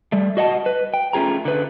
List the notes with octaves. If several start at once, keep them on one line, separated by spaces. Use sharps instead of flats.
G3 A3
F#4 D#5 F#5 A5
B4
G5
A3 C#4 F4 G#4 A#5
D3 B4